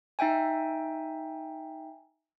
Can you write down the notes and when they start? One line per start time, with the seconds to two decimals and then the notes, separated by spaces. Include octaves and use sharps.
0.19 D#4 E5 G5 G#5